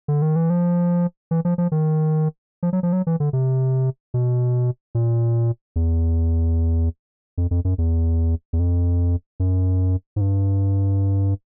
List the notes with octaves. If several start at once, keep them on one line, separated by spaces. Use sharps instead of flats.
D3
D#3
E3
F3
E3
F3
F3
D#3
F3
F#3
F3
F#3
E3
D3
C3
B2
A#2
E2
F2
F2
F#2
E2
E2
F2
F#2
G#2
G2